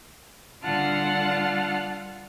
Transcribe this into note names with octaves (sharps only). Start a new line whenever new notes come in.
D3 G3 F4 F#5 A5 F6